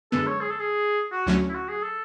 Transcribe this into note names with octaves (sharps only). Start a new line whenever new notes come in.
F#2 D3 G#3 B3 A4
C#5
G#4
A4
G#4
F#4
D2 D3 F#3 A3 C#4
E4
F#4
G#4
A4